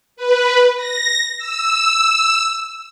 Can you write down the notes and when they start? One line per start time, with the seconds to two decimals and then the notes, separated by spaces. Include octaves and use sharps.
0.16 B4
0.77 A#6
1.38 E6